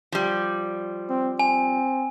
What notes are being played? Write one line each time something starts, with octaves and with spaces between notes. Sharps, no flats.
F3 G3
C4
C4 G#5